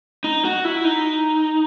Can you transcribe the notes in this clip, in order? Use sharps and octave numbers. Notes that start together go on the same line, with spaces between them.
D#4
F#4
E4
D#4